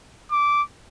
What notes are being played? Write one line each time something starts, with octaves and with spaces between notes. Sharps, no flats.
D6